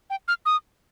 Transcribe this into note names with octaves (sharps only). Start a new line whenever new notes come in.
G5
F6
D#6